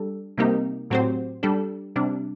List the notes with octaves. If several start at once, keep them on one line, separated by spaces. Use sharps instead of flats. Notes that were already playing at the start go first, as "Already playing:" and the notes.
Already playing: G3 D4 A4
C3 G3 A#3 D#4 G4
A2 F#3 C4 G4 C5
G3 D4 A4
C3 G3 D4